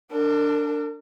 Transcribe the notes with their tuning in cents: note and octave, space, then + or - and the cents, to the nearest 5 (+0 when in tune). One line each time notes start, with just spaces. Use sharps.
D4 +0 A#4 -40